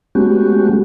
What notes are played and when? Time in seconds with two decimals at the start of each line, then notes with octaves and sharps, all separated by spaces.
0.15 G#3 A3 B3 C#4 F#4 G4